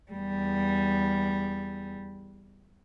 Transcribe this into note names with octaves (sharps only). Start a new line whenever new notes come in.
E2 G3